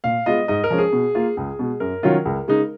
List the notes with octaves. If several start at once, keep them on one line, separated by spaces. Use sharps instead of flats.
A#2 F5
G#3 B3 F4 D#5
G#2 D#5
A#4
F3 G#3 C#4
G#4
B2
A#3 F4
C#2 G#4
B2 G#3
F#2 A#4
D#3 F#3 C#4 F4
C#2
C#3 G#3 D#4